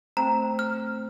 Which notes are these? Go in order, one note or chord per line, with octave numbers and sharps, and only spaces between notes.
A3 C4 A#5
F6